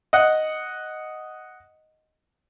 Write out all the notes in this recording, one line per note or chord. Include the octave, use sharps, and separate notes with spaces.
D#5 F#5